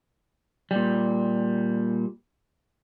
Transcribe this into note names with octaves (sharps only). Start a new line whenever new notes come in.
A#2 G3